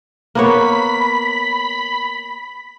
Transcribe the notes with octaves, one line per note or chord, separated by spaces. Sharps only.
A#3 B3 C#5 B5 B6